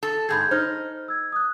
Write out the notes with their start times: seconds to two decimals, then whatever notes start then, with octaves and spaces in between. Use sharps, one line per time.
0.03 A4
0.29 G#2 C3 G#4 B5 G6 G#6
0.51 D#4 C5 F6
1.08 E6 G#6
1.32 D#6 F#6